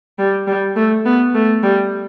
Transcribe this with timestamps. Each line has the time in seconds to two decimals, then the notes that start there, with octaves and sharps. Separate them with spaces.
0.19 G3
0.47 G3
0.76 A3
1.05 B3
1.34 A3
1.63 G3